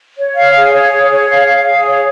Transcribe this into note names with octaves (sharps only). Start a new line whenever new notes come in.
C#5
F5
G#4
C#5
G#4
C#5
F5
F5
G#4
C#5